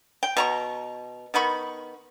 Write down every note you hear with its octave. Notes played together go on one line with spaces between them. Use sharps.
G5
B2 A#5 C#6
D#3 B3 B5 C#6